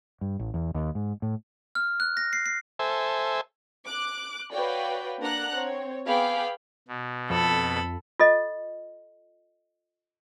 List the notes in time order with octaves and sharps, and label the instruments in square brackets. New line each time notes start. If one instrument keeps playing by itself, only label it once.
[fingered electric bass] G2
A1
E2
D#2
G#2
A2
[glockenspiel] F6
F#6
A#6
C7
C7
[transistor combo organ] A4 C5 E5 G#5
[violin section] D6 F#6
F#4 B4 C#5 D5 F5 G5
A#3 D4 F#5 A#5 F#6
C4 C#5
B3 G#4 F5 G5 B5 D6
[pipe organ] B2
[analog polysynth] F2 [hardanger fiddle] A4 B5
[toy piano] F4 A4 D#5